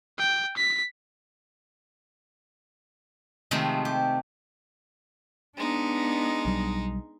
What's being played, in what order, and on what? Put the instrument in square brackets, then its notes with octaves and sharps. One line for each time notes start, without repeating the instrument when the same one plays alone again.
[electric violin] G5
B6
[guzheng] C3 D#3 F3 G#3 A3
G4
[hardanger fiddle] G#3 D#4 [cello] B3 D4
[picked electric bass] B1 F#3 G3